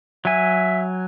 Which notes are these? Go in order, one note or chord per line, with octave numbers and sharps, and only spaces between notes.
F#3 E5 G#5